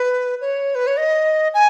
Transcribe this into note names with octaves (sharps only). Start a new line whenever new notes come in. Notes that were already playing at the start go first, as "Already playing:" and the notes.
Already playing: B4
C#5
B4
C#5
D#5
G#5